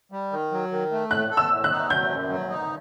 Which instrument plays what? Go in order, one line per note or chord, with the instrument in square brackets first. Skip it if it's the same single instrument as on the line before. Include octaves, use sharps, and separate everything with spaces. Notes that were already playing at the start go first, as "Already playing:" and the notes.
[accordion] G3
D#3
F#3
D#3
A3
[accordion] A2 [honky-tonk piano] F#6
[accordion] A4
[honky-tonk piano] E6
[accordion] A2
[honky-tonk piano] F#6
[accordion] D#4
[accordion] F#3 [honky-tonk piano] G6
[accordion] F#2
F#3
D#4